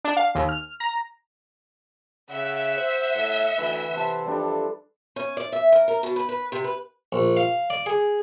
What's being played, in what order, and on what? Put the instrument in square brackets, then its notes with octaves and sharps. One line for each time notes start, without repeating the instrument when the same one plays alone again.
[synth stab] D4
F5
D#2
F6
A#5
[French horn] C#3 [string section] E5 [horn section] F#5
[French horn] C5
A2
[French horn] D2 [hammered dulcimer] E3
[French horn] C3 [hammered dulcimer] A5 C6
[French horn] F2 [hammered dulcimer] G3 D4 A4
[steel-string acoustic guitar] C#4
D5
E5
A#4
A#4
B2
B4
B4
C3
B4
[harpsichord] A#1
F5
D5
G#4